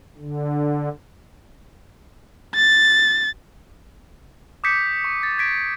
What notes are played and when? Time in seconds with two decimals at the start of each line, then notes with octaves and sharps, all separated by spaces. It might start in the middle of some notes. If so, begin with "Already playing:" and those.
0.18 D3
2.55 A6
4.64 D6 D#6 G6 B6 C#7
5.05 C#6
5.23 A6
5.38 G#6 B6 D7